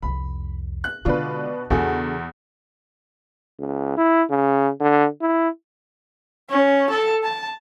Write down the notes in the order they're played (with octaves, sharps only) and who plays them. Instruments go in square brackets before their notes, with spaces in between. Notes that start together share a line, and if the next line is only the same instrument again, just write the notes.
[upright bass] C2 F2 [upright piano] B5
[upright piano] F#6
[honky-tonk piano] B2 D4 B4 [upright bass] D3 G#3 [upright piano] F4
[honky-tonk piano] E2 [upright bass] C#3 D4 [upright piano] F#4 G#4 A4
[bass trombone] C#2
E4
C#3
D3
E4
[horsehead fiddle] C#4
A4
A5